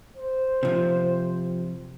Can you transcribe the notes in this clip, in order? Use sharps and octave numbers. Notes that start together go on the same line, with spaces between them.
C5
C3 F3